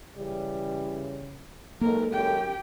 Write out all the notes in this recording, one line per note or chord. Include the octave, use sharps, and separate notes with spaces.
C#3 E3 G3
B1 G#3 A#3 A4 A#4
F#2 G4 G5